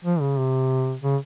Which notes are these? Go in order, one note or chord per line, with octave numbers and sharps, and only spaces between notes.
F3
C#3
C3
C#3